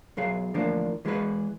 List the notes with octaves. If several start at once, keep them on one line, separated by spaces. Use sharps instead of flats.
B1 F#3 G#4 F5
A2 D3 E3 F3 A#3 D4
E3 G#3 E4 G#4 B4